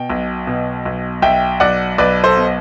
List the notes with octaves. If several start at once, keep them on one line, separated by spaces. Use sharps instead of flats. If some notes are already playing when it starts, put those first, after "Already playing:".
Already playing: B2 G5
B1
B2
B1
B1 E5 G5
B1 D5 F#5
B1 B4 D5
A4 C5
B2